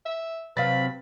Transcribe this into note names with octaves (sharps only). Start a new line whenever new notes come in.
E5
C3 F#3 B4 F5 B5 A6